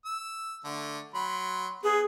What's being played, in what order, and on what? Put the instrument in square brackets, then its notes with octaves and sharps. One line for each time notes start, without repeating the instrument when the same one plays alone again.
[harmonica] E6
D3 A3
F#3 B5 C6
[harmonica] B3 [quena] G#4